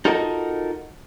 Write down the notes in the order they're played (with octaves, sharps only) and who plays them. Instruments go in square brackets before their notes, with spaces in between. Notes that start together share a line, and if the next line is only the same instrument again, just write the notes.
[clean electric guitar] D#4 F4 F#4 A4 A#4 D#5